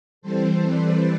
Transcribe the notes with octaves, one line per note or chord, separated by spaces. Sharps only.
E3 G3 C4 A4 C5
B4 D5